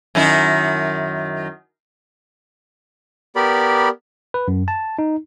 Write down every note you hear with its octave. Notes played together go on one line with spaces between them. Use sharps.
F#2 D#3 E4
B3 G4 A#4 D5 B5
B4
F#2
A5
D#4